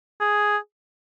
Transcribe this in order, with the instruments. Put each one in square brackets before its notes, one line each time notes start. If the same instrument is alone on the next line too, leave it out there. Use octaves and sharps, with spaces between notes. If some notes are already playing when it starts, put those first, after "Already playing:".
[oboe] G#4